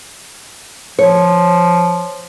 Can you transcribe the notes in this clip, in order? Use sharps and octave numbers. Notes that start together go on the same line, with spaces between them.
F3 C#5